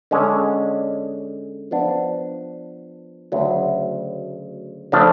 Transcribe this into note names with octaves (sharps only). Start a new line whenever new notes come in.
D3 G#3 C#4
F3 B3 D4
D2 C#3 F#3
C#3 F3 A3 D4